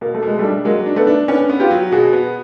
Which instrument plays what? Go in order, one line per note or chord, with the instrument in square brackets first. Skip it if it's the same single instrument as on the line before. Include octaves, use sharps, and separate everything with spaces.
[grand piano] B2 [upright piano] A#3
[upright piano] A3
[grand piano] B2 [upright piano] G#3
[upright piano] G3 A3
[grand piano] D4
[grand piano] F#3 [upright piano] G#3 A#3
[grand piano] D4
[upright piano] A3 B3
[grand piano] D4
[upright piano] B3 C#4 [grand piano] D4
[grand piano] B3
[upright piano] F4 G4
[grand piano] F#3
[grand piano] B2 [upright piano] F#4 G#4
[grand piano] B3